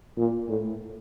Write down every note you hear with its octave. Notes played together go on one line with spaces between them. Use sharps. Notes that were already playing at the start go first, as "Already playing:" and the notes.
A#2
A2